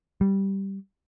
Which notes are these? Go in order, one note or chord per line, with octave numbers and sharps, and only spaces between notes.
G3